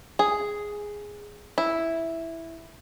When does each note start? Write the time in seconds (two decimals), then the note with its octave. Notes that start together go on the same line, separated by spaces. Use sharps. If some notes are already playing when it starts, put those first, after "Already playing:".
0.19 G#4
1.58 E4